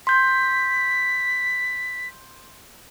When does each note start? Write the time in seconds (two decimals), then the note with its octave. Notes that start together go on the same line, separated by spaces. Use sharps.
0.07 C6 G6 B6